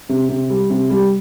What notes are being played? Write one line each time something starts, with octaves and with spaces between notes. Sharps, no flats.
C3
C3
G3
C3
G3